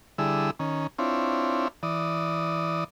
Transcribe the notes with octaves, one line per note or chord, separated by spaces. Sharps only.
D3 G3 E4 G#4 E6
D#3 C#4
C4 D4 E4 F4 C#5
E3 D5 D#6